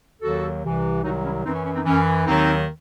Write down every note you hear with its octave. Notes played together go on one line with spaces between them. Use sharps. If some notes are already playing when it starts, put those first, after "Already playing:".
D#2 D#3 F#3 F#4 A4
C2 C3 E3
C2 C3 D#3 F#3 D#4 F#4
C#4 E4
F#2 E3 C4 D#4
C#4
C#4
C4 D#4
F#2 E3 C#4
D#2 D#3 F#3 C4 D#4